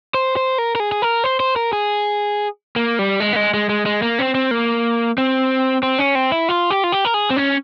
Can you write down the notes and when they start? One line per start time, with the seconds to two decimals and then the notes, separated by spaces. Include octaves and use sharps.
0.14 C5
0.36 C5
0.58 A#4
0.75 A#4
0.80 G#4
0.92 G#4
1.02 A#4
1.24 C5
1.40 C5
1.56 A#4
1.73 G#4
2.76 A#3
2.99 G3
3.20 G#3
3.33 A#3
3.36 G#3
3.54 G#3
3.69 G#3
3.86 G#3
4.02 A#3
4.19 C4
4.35 C4
4.51 A#3
5.18 C4
5.83 C4
5.99 C#4
6.15 C4
6.32 E4
6.49 F4
6.70 G4
6.84 F4
6.92 G4
7.05 A#4
7.14 G#4
7.30 C4
7.36 C#4